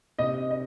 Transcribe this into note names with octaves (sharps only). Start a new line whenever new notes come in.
C3 D#5
D#5